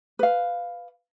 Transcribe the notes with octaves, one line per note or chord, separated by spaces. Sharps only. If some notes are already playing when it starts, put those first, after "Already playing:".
B4 F5